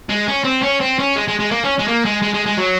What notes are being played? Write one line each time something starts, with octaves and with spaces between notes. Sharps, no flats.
G#3
C#4
C4
C#4
C4
C#4
G#3
G#3
G#3
A#3
C#4
G#3
A#3
G#3
G#3
G#3
G#3
F#3